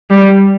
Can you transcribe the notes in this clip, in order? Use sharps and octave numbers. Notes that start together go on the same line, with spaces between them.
G3